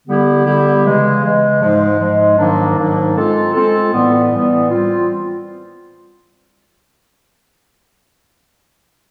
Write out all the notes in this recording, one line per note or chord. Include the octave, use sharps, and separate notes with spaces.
D3 G3 B3 E4 G4
D3 G3 B3 E4 G4
C#3 E3 G#3
C#3 E3 G#3
G#2 F3 G#3
G#2 F3 G#3
G#2 D#3 F#3 A#3 D4
G#2 D#3 F#3 A#3 D4
G#3 C4 F4 A4
G#3 C4 F4 A4
A2 E3 G3 B3
A2 E3 G3 B3
G3 C4 F4